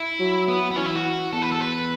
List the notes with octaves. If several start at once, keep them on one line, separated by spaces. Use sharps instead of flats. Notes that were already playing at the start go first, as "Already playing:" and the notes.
Already playing: E4
F#3
B3
B3
E3 C#4
E4
F#4
E2 A4
B4
A4
B4